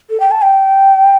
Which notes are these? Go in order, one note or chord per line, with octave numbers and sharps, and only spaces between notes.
A4
G5
A5
G5